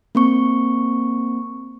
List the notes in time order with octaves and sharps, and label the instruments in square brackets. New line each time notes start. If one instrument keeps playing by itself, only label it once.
[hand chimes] A#3 C4 C#6